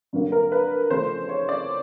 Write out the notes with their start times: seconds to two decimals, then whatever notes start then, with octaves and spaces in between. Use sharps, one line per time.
0.13 G2 D3 F#3 A#3
0.32 A#4
0.52 B4
0.90 E2 C#3 F3 A3 C#4 C5
1.29 C#5
1.49 D5